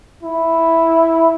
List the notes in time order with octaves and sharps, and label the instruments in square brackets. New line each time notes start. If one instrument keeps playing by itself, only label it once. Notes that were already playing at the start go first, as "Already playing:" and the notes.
[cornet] E4